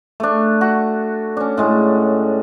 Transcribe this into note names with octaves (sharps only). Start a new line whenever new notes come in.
A3 D4
F#4
C#4 D4
A2 G#3